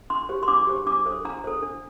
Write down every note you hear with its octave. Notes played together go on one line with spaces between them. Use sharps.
D4 C6
G4 C5
C6
D4 D6
G4 C5
D4 D6
A4 C5
D4 A#5
A4 C5
D4